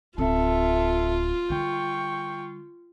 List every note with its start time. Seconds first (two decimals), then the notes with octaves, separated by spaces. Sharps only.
0.18 D1 C4 F4 A4 E5
1.50 D3 G3 G5 C#6